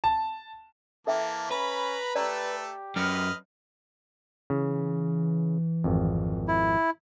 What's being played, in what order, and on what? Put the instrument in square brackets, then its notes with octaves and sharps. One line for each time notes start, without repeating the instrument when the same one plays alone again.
[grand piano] A5
[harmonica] E3 A#3 [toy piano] A4 E5 G5 [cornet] A5
[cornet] C#4 [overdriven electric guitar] B4 [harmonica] A#5 B5
[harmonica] A3 A4 [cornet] G4 [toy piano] D5 A#5 E6
[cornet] G4
[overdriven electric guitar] F#2 [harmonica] B4 D#5 F6
[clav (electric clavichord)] C#3 [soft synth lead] E3
[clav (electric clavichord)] G#1 F2
[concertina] E4